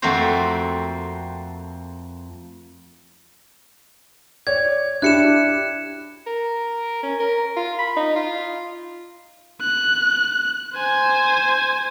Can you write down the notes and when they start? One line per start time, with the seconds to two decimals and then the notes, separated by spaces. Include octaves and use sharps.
0.02 F2 A3 A#3 C4 F#4 C5
4.47 C#5 D5 G#6
5.02 D4 E4 G4 F#6 C#7 E7
6.27 A#4
7.03 C#4
7.20 A#4
7.57 F4
7.79 B5
7.97 D#4
8.16 F4
9.62 F#6
10.75 C5 G#5